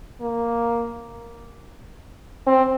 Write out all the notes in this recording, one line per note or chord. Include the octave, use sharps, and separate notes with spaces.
A#3
C4